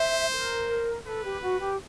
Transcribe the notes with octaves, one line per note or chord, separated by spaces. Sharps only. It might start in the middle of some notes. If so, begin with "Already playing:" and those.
Already playing: C5 E5
A#4
A4 B4
G4
F#4
G4